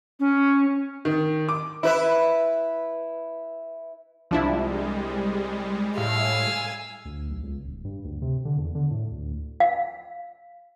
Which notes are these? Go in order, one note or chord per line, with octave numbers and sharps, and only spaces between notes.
C#4
D#3
D6
E4 B4 E5
C2 F3 G3 G#3 D4 E4
A2 F5 G#5 E6
D2
B1
C#2
D#1
G2
D2
C3
D3
E2
D3
A2
D2
F5